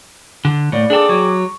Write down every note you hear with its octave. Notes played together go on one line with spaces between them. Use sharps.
D3
A2 A#3 D5 C#7
D4 G#4 A4 G5 D6
F#3 C#6